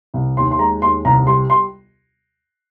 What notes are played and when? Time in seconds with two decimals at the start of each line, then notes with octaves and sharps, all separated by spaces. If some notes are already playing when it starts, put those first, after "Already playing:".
0.14 C2
0.37 D#2 C6
0.51 C6
0.59 G#3 A#5
0.82 D#2 C6
1.05 C2 A#5
1.27 G3 C6
1.50 C6